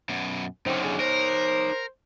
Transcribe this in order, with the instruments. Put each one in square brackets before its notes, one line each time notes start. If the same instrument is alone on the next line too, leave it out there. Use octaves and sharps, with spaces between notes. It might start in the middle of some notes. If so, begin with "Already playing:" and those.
[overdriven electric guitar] F#2 B2
[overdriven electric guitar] F#2 D3 [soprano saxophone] C4 [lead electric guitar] D#4 C#5
[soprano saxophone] G#4
[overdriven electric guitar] A#4 [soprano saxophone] C5